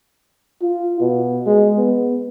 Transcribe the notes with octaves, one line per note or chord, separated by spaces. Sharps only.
F4
B2
G#3
B3